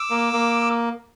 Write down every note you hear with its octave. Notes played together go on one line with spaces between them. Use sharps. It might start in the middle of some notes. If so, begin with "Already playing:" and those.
Already playing: D6 E6
A#3
A#3